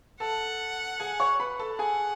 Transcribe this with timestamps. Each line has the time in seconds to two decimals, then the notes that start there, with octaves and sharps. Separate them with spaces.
0.20 A4 F#5 A5
1.00 G#4 G#5
1.20 C#5 C#6
1.40 B4 B5
1.59 A4 A5
1.79 G#4 F#5 G#5